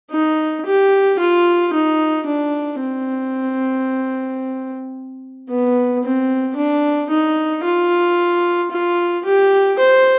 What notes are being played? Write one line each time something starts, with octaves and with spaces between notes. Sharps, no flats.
D#4
G4
F4
D#4
D4
C4
B3
C4
D4
D#4
F4
F4
G4
C5